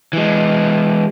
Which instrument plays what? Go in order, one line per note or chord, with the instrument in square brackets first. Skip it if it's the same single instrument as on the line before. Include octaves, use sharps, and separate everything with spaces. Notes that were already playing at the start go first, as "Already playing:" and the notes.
[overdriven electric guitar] E3 G#3